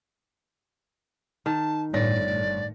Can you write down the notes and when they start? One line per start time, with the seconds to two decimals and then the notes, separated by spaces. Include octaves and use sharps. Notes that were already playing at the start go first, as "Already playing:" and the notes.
1.46 D#3 A5
1.93 G1 A2 C#5 D5 A#6